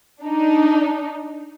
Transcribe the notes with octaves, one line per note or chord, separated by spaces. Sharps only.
D4 D#4